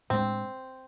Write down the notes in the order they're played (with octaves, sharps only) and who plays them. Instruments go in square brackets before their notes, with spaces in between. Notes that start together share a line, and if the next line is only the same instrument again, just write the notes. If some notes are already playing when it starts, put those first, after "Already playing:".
[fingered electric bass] A2 G#3 D4 [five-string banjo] C4